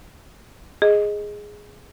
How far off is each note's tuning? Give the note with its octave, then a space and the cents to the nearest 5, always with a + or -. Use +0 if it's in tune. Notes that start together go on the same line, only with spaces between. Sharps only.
G#4 +0 D#5 +0